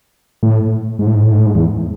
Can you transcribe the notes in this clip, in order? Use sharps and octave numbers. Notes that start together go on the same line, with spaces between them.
A2
G#2
A2
G#2
A2
G#2
A2
G#2
E2